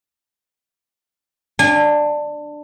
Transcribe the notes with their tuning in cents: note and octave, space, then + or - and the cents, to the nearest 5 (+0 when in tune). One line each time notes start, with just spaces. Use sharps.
D4 +15 G#5 -30